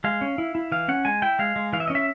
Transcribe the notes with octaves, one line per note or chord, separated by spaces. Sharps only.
G#3 F5
C#4
E4
E4
E3 F5
C#4 F#5
G#3 G#5
E4 G5
G#3 F5
G#3
E3 F5
E5
C#4 D#5
E5